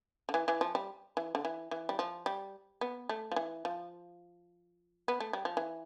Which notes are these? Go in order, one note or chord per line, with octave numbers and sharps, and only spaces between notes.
D3
E3
E3
F3
G3
E3
D3
E3
E3
G3
F3
G3
B3
A3
F3
E3
F3
B3
A3
G3
F3
E3